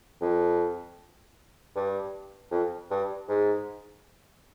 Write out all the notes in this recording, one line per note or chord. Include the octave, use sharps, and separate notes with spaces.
F2
G2
F2
G2
G#2